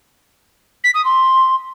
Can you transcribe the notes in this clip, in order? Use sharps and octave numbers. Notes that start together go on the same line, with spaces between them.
B6
D#6
C6